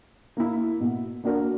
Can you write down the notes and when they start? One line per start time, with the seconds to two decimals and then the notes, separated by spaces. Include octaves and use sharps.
0.37 A#3 E4
0.81 B2
1.24 A#3 D4 F#4 A#4